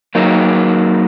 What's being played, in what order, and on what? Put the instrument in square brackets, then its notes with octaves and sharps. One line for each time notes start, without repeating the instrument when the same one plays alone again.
[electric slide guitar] F#3 A#3 D#4